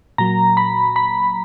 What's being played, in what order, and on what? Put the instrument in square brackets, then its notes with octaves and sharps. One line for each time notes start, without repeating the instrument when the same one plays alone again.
[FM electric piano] A#2 F#3 A#5
B5
B5